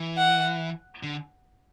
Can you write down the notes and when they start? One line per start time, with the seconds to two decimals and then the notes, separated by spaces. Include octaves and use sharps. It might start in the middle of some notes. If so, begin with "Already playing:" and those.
Already playing: E3
0.17 F#5
1.03 D3